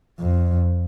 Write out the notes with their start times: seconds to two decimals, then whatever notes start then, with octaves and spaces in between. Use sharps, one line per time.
0.19 F2